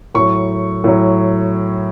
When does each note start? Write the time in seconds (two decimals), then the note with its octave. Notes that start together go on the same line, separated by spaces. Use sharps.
0.14 A2 F#3 C#6
0.84 A2 F#3